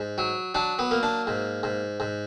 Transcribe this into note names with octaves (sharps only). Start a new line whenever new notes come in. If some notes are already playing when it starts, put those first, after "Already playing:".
Already playing: G#2
F#3
F#3 D4
B3
A#3
D4
G#2
G#2
G#2